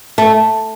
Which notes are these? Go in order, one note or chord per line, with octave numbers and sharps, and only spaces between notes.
A3